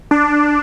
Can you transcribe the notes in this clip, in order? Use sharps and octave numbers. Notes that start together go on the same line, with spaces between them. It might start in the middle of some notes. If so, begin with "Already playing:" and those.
D4